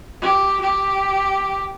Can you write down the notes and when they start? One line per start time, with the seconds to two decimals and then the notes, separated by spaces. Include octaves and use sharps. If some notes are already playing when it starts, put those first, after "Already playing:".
0.21 G4
0.61 G4